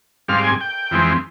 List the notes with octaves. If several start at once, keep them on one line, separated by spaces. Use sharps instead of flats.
G#2 G3 C4 F5
G#5
G5
F2 E3 G#3 C4